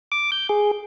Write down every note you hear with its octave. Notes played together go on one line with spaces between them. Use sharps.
D6
G6
G#4